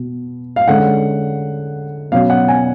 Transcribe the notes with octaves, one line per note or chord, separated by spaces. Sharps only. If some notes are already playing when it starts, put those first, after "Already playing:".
Already playing: B2
F5
D3 G#3 C#4 F#5
B2 F#3 C#4 F5
F#5
G#5